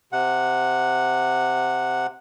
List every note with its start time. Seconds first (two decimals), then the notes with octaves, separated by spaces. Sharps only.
0.12 C3 F#5